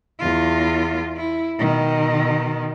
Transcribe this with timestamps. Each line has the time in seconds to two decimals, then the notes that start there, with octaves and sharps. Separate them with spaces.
0.20 E2 F4
1.17 E4
1.58 B2 D#3